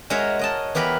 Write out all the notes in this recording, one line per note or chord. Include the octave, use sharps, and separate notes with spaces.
G#3 F#4 A#4 C#5 E5
A#4 D#5 A5
E3 B3 G4 A#4 B4 B5